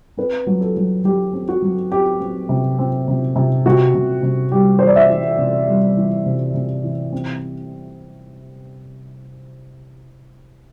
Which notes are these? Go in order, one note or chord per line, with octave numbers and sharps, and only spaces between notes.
C4 B4
F#3
A4
F#3
F#3 G4
C4
F#4
F#3
C4 G4
C4
C3
C4
C3
C3
C3 F#4
C3
C3
G3 G4
E3 C5
D5
E5
E3
C3
G3
E3
C3
C3
E3
C4